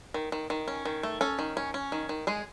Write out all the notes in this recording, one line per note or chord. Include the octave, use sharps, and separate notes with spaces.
D#3
D#3
D#3
C#4
D#3
A3
C#4 A4
D#3
C#4
C#4
D#3
D#3
G#3 G#4